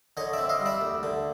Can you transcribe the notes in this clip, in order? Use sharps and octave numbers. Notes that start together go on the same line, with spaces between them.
D3 C#5 D#5
C4 D5 E5
D#5 F5
G3
D5 E5
D2
D3